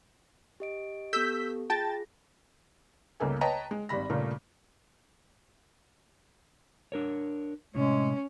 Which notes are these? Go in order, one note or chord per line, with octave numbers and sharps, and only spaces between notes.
G4 D#5 D7
B3 G4 A4 E6 G6 B6
F4 G#4 G5 A5 A6 A#6
G1 C#2 C#3 A#3 A4 G#5
B4 C#5 D#5 G5 A5 A#5
G#3
G#1 G2 G3 B5 A#6
G2 A#2 C#3 G3 A3 A#3
D4 A#4 C#5
A2 C3 G#3 C#4